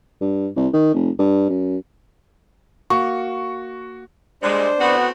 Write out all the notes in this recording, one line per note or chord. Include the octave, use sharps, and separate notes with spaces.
G2
C2
D#3
F1
G2
F#2
A#3 F#4 C#6
A#2 G3 G#3 D4 C5
A2 B3 C4 F#4